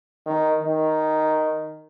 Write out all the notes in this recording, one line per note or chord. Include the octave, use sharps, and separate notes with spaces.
D#3
D#3